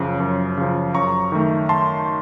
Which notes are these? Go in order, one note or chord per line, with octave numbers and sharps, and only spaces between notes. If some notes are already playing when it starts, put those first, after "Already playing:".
Already playing: F#2 C#3 F3
F#2
C#3 F3
F#2 A#5 C#6
D#3 A3
A5 C6